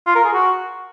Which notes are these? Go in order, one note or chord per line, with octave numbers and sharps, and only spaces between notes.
F4
A#4
G#4
F#4